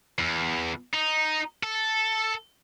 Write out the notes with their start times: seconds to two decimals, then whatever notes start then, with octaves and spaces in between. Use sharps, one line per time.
0.19 E2
0.94 D#4
1.63 A4